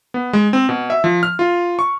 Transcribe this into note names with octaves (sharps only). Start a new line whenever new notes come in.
B3
G#3
C4
B2
E5
F3
F6
F4
C#6